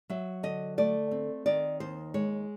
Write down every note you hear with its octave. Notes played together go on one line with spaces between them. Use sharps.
F#3 E5
D3 D#5
A3 D5
C4
D#3 D5
D#2 C5
G#3 C#5